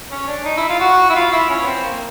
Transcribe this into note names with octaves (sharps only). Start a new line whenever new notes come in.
C#4
D4
D#4
E4
F4
F#4
E4
F4
E4
C#4
B3
C4
A#3